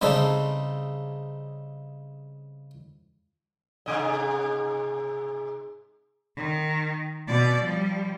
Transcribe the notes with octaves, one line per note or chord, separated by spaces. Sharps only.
C#3 G3 C4 D#4 G#4 A4
G#2 C3 D#5
D#3
B2 D5
F3 G3